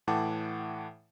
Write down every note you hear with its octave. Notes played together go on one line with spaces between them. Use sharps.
A2 E3 F#5 G5 A5 D6